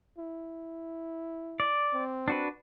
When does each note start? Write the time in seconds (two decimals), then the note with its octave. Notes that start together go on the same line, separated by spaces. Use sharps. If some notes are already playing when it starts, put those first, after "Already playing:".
0.18 E4
1.60 D5
1.93 C4
2.28 D4 F#4 B4